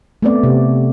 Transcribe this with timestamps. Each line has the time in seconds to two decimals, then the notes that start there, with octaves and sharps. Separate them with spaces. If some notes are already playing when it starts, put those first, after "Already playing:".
0.22 A3 B3 C4 D5
0.43 C3